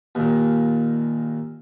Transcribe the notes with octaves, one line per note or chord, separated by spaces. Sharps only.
D#2 A#2